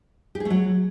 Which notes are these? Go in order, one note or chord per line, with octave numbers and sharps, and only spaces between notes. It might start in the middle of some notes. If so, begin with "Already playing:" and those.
G4
G#4
A3
F#3